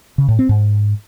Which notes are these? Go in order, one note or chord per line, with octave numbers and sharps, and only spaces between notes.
C#3
A2
C4
G#2